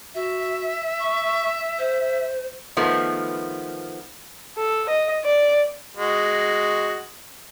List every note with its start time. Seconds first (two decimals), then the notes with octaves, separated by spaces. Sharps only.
0.15 F#4 E5
1.00 C#6
1.79 C5
2.77 D#3 F3 A3 B3
4.58 A4
4.89 D#5
5.24 D5
5.97 G#3 F#4